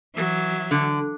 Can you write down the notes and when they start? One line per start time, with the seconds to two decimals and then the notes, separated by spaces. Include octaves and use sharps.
0.14 E3 F#3 E5
0.71 D3